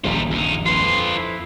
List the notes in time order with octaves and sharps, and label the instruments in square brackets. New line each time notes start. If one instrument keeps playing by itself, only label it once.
[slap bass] D#1 A#1 G2 [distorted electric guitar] G3 F4
[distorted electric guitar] F2 D#4
[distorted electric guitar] F4 B4 [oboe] C6
[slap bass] F2
[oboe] E4